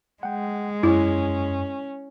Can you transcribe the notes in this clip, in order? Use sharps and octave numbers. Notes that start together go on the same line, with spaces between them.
G#3 F#5 G5
F#2 C#4 E4